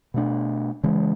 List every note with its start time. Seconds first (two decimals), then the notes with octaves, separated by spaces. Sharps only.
0.14 B2 A3 D4
0.83 C#3 E3 G#3